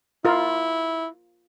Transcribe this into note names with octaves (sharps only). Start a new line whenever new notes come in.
E4 F4 A#4